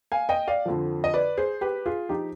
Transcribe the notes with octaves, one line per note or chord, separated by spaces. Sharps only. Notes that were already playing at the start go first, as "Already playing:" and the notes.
F5 G#5
D#5 G5
D5 F5
F2 D3 F3
D#5
B4 D5
G#4 C5
G4 B4
F4 G#4
F3 D#4 G4